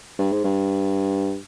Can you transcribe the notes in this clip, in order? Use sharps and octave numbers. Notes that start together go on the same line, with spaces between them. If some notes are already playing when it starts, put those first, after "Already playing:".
G2
G#2
G2